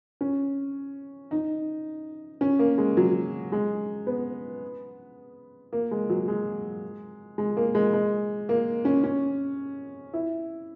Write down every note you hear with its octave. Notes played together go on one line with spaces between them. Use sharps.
C#4
D#4
C#4
A#3
G#3
F#3
G#3
B3
A#3
G#3
F#3
G#3
G#3
A#3
G#3
G#3
A#3
C#4
C#4
E4